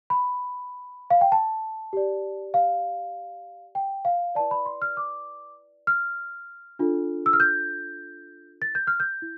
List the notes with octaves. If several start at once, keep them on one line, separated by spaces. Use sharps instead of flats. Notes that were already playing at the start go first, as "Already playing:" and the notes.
B5
F5
G5
A5
G4 D5
F5
G5
F5
E4 B4 D5 A5
B5
C6
F6
D6
F6
D4 F4 A4
E6
F6
G6
A6
G6
F6
G6
E4